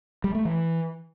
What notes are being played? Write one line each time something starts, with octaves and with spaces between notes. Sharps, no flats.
G3
A3
E3